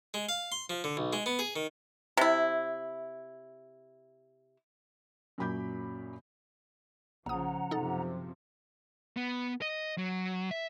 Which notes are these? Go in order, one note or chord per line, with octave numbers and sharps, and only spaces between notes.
G#3
F5
C6
F3
D3
B1
G#3
B3
G#4
D#3
C3 E4
F#2 A#2 F#3 B5 D6 G6
A#1 C#3 F3 F#5 A#5 D#6
F#2 C3 F3 D#4 A4
B3
D#5
F#3
E5